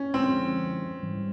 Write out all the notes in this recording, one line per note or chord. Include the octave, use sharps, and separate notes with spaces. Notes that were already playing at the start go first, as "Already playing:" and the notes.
Already playing: C#4
D3 F3 G#3 C4
G#2 E3 G3